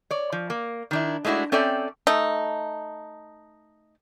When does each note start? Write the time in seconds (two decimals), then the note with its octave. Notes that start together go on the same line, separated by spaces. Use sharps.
0.11 C#5 D5
0.32 F3
0.50 A#3
0.91 D#3 D4 E4
1.25 G#3 A3 D4 E4 F#4
1.52 C4 C#4 A4 D5 E5 G5
2.07 A3 D#4